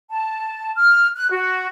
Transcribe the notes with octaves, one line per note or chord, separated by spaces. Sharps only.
A5
F6
F#6
F#4